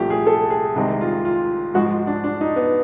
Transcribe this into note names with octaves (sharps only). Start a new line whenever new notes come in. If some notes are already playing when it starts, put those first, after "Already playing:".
Already playing: C2 A#2 F3 A3 G4
G#4
A4
G#4
C2 C3 D#3 G#3
F4
F4
G#2 F3 G#3 F#4
D4
D4
D#4
B3